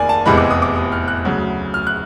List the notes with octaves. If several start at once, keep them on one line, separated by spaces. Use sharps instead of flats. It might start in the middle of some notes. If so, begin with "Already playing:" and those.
Already playing: F1 D#2 D#3 A#3 D5 G#5
A5
F1 E2 C3 E3 G#3 B5
D6
D#6
D6
D#6
F6
F#6
D2 C#3 F#3
F6
F#6